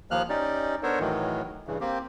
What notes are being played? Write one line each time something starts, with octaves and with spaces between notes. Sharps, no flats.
D#2 F3 A#3 F6 F#6
C#4 D#4 G4 D5
B3 D4 A4 A#4 C5 C#5
A2 D#3 E3 F#3
G2 C#3 E3
A#3 C4 G4